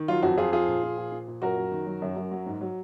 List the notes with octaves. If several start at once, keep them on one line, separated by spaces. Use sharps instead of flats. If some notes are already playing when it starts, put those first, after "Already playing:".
Already playing: D#3
F#3 F4
F2 F#4
F2 F4 G#4
F3 F4 G#4
A#2
F3
A#2
F3
A#2
F#2 F#4 A#4
F#2
D#3
F#3
F#2
F#2
F#3
G#2
F#3